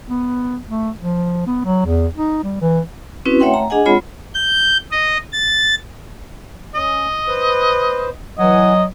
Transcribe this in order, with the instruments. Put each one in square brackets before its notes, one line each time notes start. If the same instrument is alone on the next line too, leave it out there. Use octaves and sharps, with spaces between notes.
[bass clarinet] B3
A3
F3
B3
F#3
E2
D#4
G3
E3
[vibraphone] C4 C#4 E4 F#4 B4
A3 C#5 E5 F#5 G5 C6
A#5
D4 G#4 D#5 F#5 G#5
G#3 C4 F4 C#5 F#5 B5
[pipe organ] G6
D#5
A6
[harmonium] C#4 [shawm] D#5
[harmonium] B4 C5
[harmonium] E3 F#5 G#5 [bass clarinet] F#3 [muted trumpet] D#5